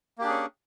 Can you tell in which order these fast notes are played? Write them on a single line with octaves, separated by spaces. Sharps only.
A#3 G4 D4 G#4 C#4